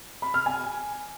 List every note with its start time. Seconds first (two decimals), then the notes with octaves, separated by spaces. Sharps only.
0.22 B5
0.34 F6
0.46 G#5